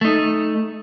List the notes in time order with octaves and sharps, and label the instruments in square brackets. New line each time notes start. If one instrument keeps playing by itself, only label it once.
[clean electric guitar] A3 D#4